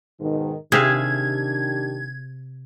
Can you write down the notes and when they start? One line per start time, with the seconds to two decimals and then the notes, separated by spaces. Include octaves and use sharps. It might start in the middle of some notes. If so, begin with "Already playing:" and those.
0.19 G#2 B2 D#3
0.72 C3 D#3 D4 G4 G#4 E5 F5 G#6